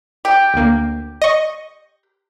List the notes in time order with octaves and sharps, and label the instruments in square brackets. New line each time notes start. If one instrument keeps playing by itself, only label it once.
[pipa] G4
[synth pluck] D2 A#3
D#5 C#6